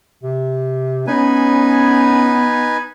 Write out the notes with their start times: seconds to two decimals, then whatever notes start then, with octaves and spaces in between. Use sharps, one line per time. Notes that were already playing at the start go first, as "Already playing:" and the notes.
0.23 C3
1.07 B3 C#4 D#4 B4 G#5